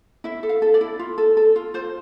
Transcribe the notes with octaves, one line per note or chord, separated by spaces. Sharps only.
E4 E5
A4
F5
A4
D5
E4
F4
A4
A4
F4
F4 C5